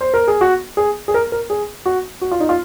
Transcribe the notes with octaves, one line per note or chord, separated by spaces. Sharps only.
C5
A#4
G#4
F#4
G#4
G#4
A#4
A#4
G#4
F#4
F#4
F4
D#4
F4